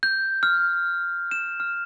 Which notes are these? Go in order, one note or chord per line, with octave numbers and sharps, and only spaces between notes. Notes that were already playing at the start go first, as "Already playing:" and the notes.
G6
F6
E7
F6